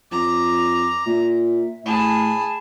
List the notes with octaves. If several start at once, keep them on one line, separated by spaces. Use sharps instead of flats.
F2 A#5 D6
A#2 E5
A2 G#4 A5 B5